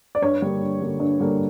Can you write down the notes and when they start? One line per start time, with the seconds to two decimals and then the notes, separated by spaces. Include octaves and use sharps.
0.15 D5
0.22 G2 C#5
0.42 D3 G3 A#3
0.61 G2
0.80 D3 G3 A#3
1.00 G2
1.20 D3 G3 A#3